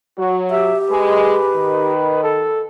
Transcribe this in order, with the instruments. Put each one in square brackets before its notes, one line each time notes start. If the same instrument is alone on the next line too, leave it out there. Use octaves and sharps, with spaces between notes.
[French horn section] F#3 [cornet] F#4
[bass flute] G4 [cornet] E5
[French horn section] G#3 [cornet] B4
[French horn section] D#3
[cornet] A4